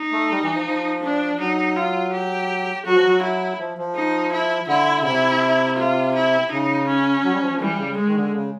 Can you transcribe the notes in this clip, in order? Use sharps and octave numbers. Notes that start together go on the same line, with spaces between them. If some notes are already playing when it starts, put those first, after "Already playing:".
Already playing: D#4
A3
G3
E3
F3
F3
D4
F#3 D#4
F4
G4
F#3 F#4
F3
F#3
E4
F3
F3
D#4
E4
D3 E4
C#3
C3 E4
F4
E4
C#3 D#4
C#4
F#3
G3
F3
F3
E3 G3
C#3
G#3
D#3
D3
C#3